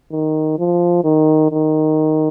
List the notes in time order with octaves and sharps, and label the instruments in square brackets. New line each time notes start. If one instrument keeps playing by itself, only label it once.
[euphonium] D#3
F3
D#3
D#3